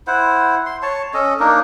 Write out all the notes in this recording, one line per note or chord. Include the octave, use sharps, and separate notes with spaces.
E4 C5 F#5
C6
C#5 A5
C#4 A4 D#5
A#3 D4 D#4 A#4